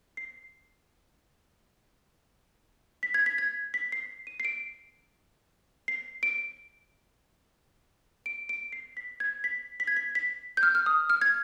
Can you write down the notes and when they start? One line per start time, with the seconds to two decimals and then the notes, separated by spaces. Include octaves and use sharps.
0.17 C7
3.03 B6
3.14 G#6
3.26 B6
3.38 G#6
3.74 B6
3.92 C7
4.27 D#7
4.40 C7
4.45 D7
5.88 C7
6.23 D7
8.26 D7
8.49 D7
8.72 C7
8.97 B6
9.20 G#6
9.44 B6
9.80 B6
9.87 G#6
9.97 B6
10.15 B6
10.57 G6
10.63 F6
10.75 F6
10.86 D#6
11.10 F6
11.21 G#6